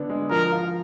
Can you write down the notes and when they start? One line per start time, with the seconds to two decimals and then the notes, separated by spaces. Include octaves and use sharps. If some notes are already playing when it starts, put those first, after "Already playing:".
Already playing: D3 B3 D4
0.09 G#3
0.31 F3 A#4
0.52 F4